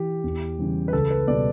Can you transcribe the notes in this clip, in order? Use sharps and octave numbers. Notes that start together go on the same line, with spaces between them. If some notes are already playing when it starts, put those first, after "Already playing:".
Already playing: E3 G4
E2
C#3 E3 G3
B4
C#2 A4
B4
B2 G3 D5